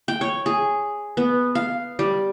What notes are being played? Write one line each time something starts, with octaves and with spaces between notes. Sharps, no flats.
G5
C#5
G#4
B3
F5
G3